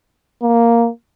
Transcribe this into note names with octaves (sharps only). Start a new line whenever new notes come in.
A#3